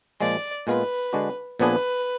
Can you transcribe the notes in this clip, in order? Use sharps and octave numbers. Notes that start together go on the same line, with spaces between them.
A#2 F3 G#3 D5
A#2 G#3 B3 F4 B4
D3 G#3 D4 F#4
A#2 F3 B3 D4 G#4 B4